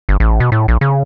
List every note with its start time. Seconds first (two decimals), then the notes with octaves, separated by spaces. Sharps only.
0.09 G1
0.20 A1
0.40 B2
0.52 A2
0.68 A#1
0.81 C#3